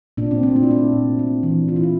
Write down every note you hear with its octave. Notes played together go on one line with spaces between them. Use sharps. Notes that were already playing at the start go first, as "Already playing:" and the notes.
A#2 D4
C4
A3 C4
D4
E4
A3 D4
A#2
C4
E3
E3 F4
E4
F4